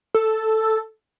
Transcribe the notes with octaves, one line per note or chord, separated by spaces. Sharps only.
A4